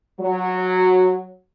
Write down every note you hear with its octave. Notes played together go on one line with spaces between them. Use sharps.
F#3